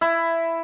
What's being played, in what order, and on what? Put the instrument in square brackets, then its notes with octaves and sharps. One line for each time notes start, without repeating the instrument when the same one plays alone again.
[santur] E4